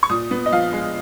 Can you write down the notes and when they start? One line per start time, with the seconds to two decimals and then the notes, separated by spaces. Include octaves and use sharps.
0.03 C#6
0.10 A#2 D#6
0.31 B3
0.46 D#5
0.52 F3 F5
0.73 G#3